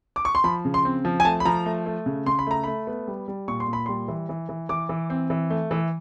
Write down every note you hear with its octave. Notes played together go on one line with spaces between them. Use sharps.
D6
C#6
C6
F3 B5
C#3
C6
C4
F3
G#5
A3 A5
B5
F3 A#5
A3
A3
C#3
C#3 C6
B5
A3 A#5
A3 B5
B3
G3
G3
A#2 C#6
C6
A#2
B5
G3 C6
E3
E3
E3
E3 D6
E3
C4
E3
A3
E3